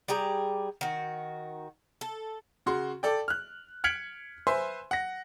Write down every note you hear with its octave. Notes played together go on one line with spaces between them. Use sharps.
G3 G4 G#4 A#5
D#3 F#4
A4
C#3 F#4 C6
A4 D5 G5
F6 F#6
F6 G#6 B6 C#7 D7 F#7
B4 C5 E5 G#5 C6
F#5 A#6